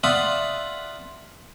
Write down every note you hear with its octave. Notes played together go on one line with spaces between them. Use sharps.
F4 D5 E5 F#5 A5 D#6